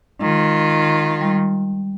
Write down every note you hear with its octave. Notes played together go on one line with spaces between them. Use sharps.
D#3 G#3 F4
G3